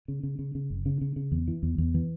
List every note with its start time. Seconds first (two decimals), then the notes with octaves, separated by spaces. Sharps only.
0.08 C#3
0.23 C#3
0.39 C#3
0.55 C#3
0.70 F#1
0.86 C#3
1.01 C#3
1.16 C#3
1.32 E2
1.48 E3
1.63 E2
1.78 E2
1.94 E3